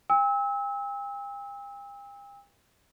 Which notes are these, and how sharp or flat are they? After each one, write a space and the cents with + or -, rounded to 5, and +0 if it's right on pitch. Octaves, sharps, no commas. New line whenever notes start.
G5 +45 E6 -30